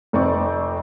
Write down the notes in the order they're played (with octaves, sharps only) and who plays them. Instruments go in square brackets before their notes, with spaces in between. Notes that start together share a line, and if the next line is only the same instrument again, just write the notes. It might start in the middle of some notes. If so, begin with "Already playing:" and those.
[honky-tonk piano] F1 F2 C4 D5 C#6